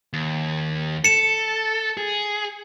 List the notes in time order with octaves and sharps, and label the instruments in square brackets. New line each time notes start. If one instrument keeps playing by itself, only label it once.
[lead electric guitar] D#2
[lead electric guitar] A4 [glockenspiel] C#7 E7
[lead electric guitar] G#4